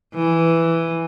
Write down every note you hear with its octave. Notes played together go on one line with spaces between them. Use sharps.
E3